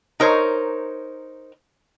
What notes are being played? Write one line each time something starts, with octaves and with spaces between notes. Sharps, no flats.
D#4 A#4 C5 C#5